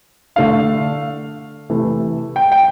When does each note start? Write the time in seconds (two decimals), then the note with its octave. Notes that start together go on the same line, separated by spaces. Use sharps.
0.36 D3 A3 D4 F5
1.70 C3 E3 A3
2.36 G5
2.52 G5